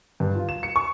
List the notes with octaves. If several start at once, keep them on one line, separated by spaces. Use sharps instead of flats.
G2
F4
E7
C#7
C#6